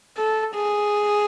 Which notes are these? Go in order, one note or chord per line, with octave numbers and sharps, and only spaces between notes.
A4
G#4